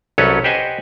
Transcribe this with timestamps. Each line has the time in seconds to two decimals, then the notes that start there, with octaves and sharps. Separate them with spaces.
0.18 C2 F#3 C#4 A4 B4 C#5
0.44 G4 B4 C5 D#5 F#5 G#5